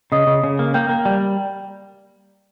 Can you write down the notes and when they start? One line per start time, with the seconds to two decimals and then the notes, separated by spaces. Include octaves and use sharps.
0.12 C#3 D#5 D#6
0.27 C#3
0.44 C#3
0.59 A#3
0.74 A#3 G5 G6
0.89 A#3
1.05 G3